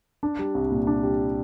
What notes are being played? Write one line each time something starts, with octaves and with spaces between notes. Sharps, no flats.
D4
G3
C2
A#2
D4
G3